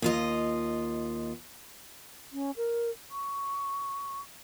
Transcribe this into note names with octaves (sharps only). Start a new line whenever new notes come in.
D#2 F4 D#5
C#4
A#4
C#6